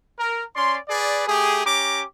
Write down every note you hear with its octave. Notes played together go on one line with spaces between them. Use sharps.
A#4
C#4 D5 C6
G#4 B4 D5
A3 G4 G#4
C#4 G4 A#5 D6